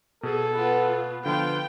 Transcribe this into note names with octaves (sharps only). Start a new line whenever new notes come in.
B2 G#4 A4
B3 F4 B4 F#5
D3 F3 B3 F4 G5